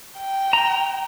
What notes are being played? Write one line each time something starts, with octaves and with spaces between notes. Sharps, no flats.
G5
A#5